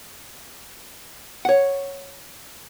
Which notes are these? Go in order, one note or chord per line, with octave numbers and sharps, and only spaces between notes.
C#5 F#5